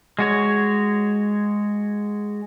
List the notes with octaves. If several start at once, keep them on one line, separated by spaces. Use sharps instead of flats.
G#3 F#4 C#5